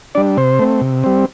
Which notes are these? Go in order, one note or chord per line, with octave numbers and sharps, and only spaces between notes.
G3 D4 D5
C3 C5
A3 C4
C3
G3 C4